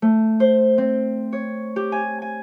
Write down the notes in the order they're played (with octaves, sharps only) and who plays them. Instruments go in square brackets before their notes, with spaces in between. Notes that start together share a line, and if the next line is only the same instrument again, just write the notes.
[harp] A3
C5
C4
C#5
G4
G#5
G#5